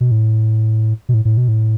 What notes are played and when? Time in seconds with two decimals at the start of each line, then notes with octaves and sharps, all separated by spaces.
0.01 B2
0.11 A2
1.09 B2
1.14 A2
1.25 A2
1.37 B2
1.48 A2